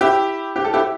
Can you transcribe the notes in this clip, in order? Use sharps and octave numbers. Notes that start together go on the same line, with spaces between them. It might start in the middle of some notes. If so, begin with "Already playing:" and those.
E4 G4
G4
A4
E4 G4